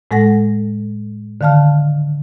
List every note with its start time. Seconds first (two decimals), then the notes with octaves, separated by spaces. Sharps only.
0.11 A2 G#3 A4 F#5 A#6
1.41 D3 D#3 F5 A5 F6